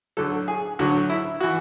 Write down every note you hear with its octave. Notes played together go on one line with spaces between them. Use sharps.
D2 D3 F#3 A4
G#4
D2 D3 F#3 F#4
E4
E3 F#4